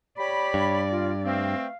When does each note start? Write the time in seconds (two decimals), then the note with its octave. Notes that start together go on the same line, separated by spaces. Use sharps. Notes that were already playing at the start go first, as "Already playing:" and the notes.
0.18 G4 C#5 D5 B5
0.54 G2
0.91 F4
1.25 B2 A3 C4 F5